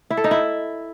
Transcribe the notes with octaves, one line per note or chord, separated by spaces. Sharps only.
E4
A4
D#4
E4